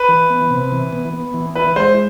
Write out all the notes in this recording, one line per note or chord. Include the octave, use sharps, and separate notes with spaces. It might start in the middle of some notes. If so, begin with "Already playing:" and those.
Already playing: B4
E3
B3
C3
E3
B3
B3
E3
E4 B4
G#3 C5